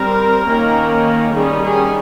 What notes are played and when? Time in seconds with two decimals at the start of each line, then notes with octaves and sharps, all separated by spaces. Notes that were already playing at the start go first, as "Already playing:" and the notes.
Already playing: G3 C4 A#4
0.45 D#3 A#3 C#4
1.32 D#3 G3 C#4 G#4
1.62 G#4